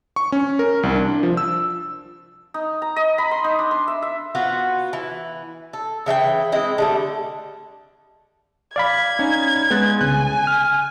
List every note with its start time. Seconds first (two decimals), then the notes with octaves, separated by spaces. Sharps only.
0.16 C#6
0.32 C#4
0.59 A#4
0.83 C2
0.96 D4
1.23 F3
1.37 E6
2.54 D#4
2.82 A#5
2.96 D#5
3.18 B5
3.31 C6
3.44 D#4
3.59 D4
3.71 C6
3.88 E5
4.02 E5
4.35 B3 F4 F#4 C5
4.93 E3
5.73 A4
6.06 C#3 E3 E4 G5
6.52 G#3 C4 E4 D#5
6.78 D3 G3 A3
8.76 D5 F5 B5 G#6
9.19 C#4 D#4
9.71 G#3 B3 F#6 A6
10.01 C2 C#3 G#5 F#6
10.47 F6